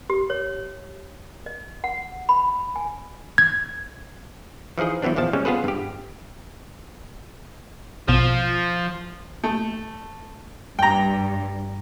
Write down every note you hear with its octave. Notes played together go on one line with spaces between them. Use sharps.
G4
C#5
D#5
F#5
B5
G#5
G#6
E3 F3 D#4 G#4 D#5
E3 F#3 B3 C4 D4
A#1 E2 F3 A5
C#3 G3 G#3 C#4
B3 F4 G#4 A4 B4
G2 G4
A#1 B2 F3 E7
A3
G2 G5 A#5